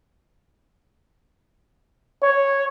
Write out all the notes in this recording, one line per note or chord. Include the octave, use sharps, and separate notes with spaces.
C#5